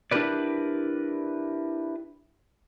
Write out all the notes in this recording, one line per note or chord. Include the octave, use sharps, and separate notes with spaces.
D4 E4 G4 A#4 B4 D5